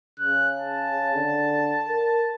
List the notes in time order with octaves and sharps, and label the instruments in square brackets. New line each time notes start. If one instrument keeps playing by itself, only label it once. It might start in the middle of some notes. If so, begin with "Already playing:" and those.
[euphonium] C#3 [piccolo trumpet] F#6
[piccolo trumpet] A5
[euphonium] D3
A#4